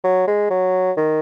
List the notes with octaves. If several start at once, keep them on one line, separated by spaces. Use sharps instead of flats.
F#3
G#3
F#3
D#3